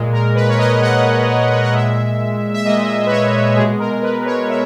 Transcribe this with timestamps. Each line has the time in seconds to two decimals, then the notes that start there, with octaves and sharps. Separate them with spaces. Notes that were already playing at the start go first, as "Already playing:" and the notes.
Already playing: A#2 G#3
0.12 A#4
0.36 B4
0.49 C#5
0.59 D#5
0.81 A#2 G#3 F#5
1.29 A#4
1.40 B4
1.50 C#5
1.62 D#5
1.73 A#2 G#3 E5
2.54 E5
2.65 A#2 G#3 D#5
3.07 B4
3.11 C#5
3.56 B2 G#3 G#4
3.79 A#4
4.03 B4
4.26 C#5
4.49 G#3 E5